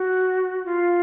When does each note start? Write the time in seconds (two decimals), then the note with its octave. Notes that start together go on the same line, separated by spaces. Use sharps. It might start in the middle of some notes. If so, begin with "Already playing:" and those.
Already playing: F#4
0.66 F4